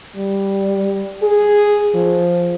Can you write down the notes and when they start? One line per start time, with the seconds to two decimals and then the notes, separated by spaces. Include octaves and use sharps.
0.16 G3
1.23 G#4
1.95 F3